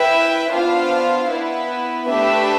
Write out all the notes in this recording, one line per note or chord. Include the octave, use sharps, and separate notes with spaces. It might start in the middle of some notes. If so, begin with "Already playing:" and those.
Already playing: E4 B4 E5 G5
B3 D4 F4 C5 F5
B3 E4 B4
A3 D4 G4 B4 E5